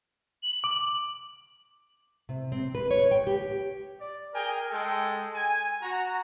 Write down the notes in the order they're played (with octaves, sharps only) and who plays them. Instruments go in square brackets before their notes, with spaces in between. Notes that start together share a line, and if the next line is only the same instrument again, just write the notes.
[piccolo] F#7
[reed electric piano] D6
[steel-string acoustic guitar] C3
C4
B4
C#5
G5
G4
[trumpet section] D5
G#4 A#4 G5 G#5
G#3 A4 G5
G#5
F#4 A#5